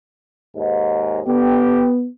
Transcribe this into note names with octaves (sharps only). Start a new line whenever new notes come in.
D#2 G#2
D3 B3 G4